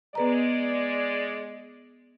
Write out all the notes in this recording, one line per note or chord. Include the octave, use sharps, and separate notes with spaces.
G#3 B3 B4 D5 A#5